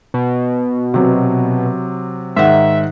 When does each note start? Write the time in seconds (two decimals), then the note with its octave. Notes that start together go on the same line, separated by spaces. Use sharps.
0.14 B2
0.94 C3 F#3
2.36 G#2 D#3 E5 F#5